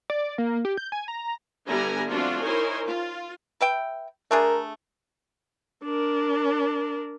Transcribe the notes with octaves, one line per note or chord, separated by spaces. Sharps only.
D5
A#3
G4
G6
G#5
A#5
D3 G3 B3 E4 G#5 A#5
F3 A3 C4 D4 F4 F#4
D#4 E4 A#4 C5 C#5 G#5
F4
B4 E5 G5
A3 D4 G#4 A#4
D4 A#4